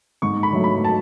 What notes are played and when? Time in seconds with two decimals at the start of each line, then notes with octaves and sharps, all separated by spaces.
0.22 G#2 C#6
0.43 B5
0.53 F#3 A3
0.64 B5
0.85 A5